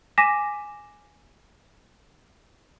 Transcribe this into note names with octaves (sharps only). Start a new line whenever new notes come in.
G#5 D6 A#6 B6 D#7 E7